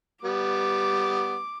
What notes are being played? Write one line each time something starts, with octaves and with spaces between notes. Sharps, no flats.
G3 B3 D6